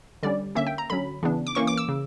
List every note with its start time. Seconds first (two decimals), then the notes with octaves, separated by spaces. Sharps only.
0.23 D3 G3 C#4 D5
0.55 D3 A#3 C#4 E5
0.67 G5
0.78 A#5
0.90 D3 F#3 C#4 B5
1.23 C#3 E3 B3 D4
1.47 D6
1.55 E3 A#3 C#4 C#6
1.67 D6
1.77 E6
1.88 C#3